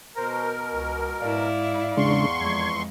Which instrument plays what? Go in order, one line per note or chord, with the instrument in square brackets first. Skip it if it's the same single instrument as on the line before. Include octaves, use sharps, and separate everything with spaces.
[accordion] B2 A#4 [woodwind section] C5 A#5
[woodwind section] C#2
[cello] G#2 E4 [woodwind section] D5 F5
[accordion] E2 C6 C#6 [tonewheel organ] C#3 G#3 D4
[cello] F2 G#3 [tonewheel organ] G#6